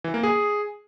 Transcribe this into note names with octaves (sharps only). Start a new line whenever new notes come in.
E3
A#3
G#4